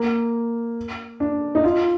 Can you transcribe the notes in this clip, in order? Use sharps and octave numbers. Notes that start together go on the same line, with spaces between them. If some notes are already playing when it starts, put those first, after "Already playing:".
Already playing: A#3
D4
D#4
F4